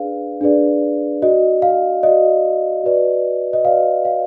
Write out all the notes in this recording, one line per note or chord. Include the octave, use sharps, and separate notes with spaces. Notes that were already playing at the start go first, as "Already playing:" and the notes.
Already playing: D4 G#4 B4 D5 F5
D4 G#4 B4 D5
F#4 D5 D#5
F5
F#4 D5 D#5
F#4 B4 D5
D#5
F#4 B4 D5 F5
F5